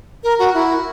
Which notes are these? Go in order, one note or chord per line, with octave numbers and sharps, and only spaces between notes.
A#4
F#4
E4